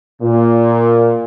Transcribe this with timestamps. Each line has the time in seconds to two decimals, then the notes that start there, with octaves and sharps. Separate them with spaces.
0.22 A#2